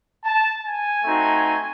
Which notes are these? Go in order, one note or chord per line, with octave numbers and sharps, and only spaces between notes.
A5
G#5
A3 C4 D#4 F#4